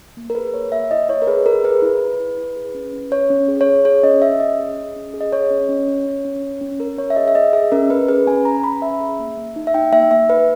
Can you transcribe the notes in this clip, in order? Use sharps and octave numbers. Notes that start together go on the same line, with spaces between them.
A#3
A#4
G#4 B4
A#3 C#5
A#3 E5
E4 D#5
E4 C#5
A#4
G#4 B4
G#4 A#4
G#4 B4
E4
E4
E4
E4
G#4
C#4
C#4
C#4 C#5
C#4
G#4
C#5
G#4
G#4 C#5
C#4 D#5
C#4 E5
C#4 D#5
G#4
G#4
C#4
G#4
D#5
G#4 C#5
C#4
C#4
C#4
C#4
C#4
C#4
C#4
C#4 A#4
C#4 C#5
E5
G#4 D#5
E5
G#4 D#5
G#4 E5
C#4 A#4
C#4 B4
G#4 B4
C#4 G#5
C#4 A#5
C#4 B5
C#4 E5
G#4
A#3
A#3
D#4
E5
D#4 G5
A#3 E5
A#3 E5
A#3 B4